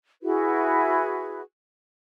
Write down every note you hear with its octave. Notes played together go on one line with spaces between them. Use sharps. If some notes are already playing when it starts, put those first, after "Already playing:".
E4 F#4 G#4 B4